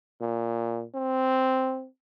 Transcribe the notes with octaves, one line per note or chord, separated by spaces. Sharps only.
A#2
C4